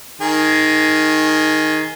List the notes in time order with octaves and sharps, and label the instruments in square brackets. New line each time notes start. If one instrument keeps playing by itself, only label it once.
[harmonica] D#3 G#4